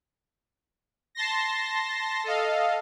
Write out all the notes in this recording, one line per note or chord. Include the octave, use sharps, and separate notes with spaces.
A5 C6 A#6
A4 D#5 F5